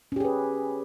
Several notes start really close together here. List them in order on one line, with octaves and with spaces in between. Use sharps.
C#4 G4 G#4 B4